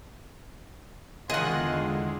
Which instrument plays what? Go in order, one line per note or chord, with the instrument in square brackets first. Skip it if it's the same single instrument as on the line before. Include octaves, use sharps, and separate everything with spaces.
[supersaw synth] E2 D3 G#3 [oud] D#3 D#5 [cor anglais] F4 [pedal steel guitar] G#4 F#5